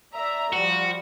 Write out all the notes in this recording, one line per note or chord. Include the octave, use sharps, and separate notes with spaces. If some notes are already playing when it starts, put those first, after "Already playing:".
D5 E5 A#5
F3 G3 F#4